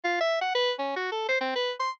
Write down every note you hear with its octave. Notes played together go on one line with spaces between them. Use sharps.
F4
E5
F#5
B4
C#4
F#4
A4
C5
C4
B4
C6